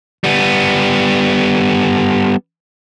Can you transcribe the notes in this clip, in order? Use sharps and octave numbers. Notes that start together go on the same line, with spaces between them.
G3 B3